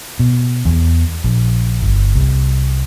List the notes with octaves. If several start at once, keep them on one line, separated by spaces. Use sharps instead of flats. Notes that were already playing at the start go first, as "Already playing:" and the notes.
B2
E2
A#1
G1
C2